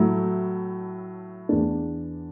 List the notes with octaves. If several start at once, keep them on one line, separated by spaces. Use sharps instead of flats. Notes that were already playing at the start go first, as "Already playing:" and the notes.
Already playing: A2 F#3 A3 E4
E2 E3 D4